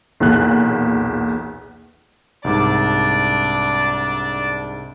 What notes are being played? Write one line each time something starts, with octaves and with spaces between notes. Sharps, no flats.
B1 E2 A#2 F#6
C2 G#2 D4 D5 D6